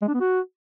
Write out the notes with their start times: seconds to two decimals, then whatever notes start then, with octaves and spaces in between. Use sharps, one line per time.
0.02 G#3
0.08 D4
0.14 B3
0.20 F#4